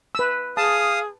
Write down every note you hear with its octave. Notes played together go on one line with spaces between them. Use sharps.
B4 E6
G#4 F5 A5 D#6